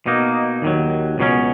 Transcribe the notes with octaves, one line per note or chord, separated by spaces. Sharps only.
B2 A#3 D#4
D#2 D#3 F#3
C#2 B2 F#3 C#4